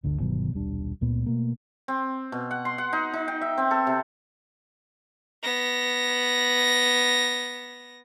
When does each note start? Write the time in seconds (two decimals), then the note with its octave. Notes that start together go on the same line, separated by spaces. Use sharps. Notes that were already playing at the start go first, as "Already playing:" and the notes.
0.03 G1 D2 B2 D3
0.19 G1 B2 D#3 F#3
0.53 D#1 B1 G3 D4
1.01 C#2 A#2 B3
1.26 B2 A3 A#3
1.88 C4
2.32 B2
2.51 F#5
2.65 C6
2.78 F#5
2.93 D#4
3.13 D#4
3.28 G5
3.41 E5
3.58 C4
3.71 A4
3.87 C3
5.43 B3 A#6